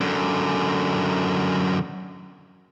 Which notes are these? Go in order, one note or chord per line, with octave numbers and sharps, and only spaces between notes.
F#2 D3